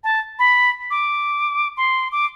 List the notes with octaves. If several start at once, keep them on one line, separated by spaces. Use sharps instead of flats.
A5
B5
D6
C6
D6